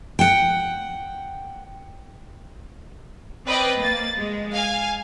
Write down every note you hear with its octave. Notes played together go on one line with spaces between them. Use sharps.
F#5 G5
C4 B4 D5 D#5 G5
A#3 A6
G#3
F5 G#5